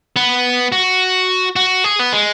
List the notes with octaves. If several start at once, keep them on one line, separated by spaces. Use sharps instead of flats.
B3
F#4
F#4
G#4
B3
G#3